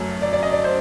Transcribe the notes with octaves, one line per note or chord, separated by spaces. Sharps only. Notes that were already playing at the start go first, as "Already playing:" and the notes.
Already playing: F#2 F#3 A3
D5
D5
D#5
D5
C5